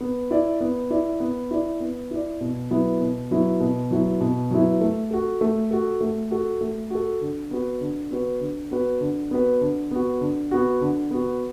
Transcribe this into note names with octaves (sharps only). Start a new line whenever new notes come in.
B3
E4 D5
B3
E4 D5
B3
E4 D5
B3
E4 D5
B2
F#3 B3 E4
B2
F#3 B3 E4
B2
F#3 B3 E4
B2
F#3 B3 E4
A3
F#4 A4
A3
F#4 A4
A3
F#4 A4
A3
F#4 A4
D3
B3 F#4 B4
D3
B3 F#4 B4
D3
B3 F#4 B4
D3
B3 F#4 B4
D3
B3 F#4
D3
B3 F#4
D3
B3 F#4